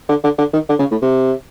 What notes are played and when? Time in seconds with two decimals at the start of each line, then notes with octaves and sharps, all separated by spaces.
0.09 D3
0.24 D3
0.38 D3
0.53 D#3
0.69 D3
0.79 C#3
0.91 A2
1.02 C3